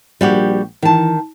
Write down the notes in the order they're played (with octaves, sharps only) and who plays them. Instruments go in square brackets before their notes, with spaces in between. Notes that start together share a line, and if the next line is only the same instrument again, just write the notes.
[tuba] A#1 [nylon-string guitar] G3 F#4 G4
[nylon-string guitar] D#3 A5 [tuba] E3